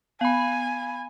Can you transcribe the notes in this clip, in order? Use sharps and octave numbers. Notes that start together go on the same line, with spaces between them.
B3 F5 G#5 B5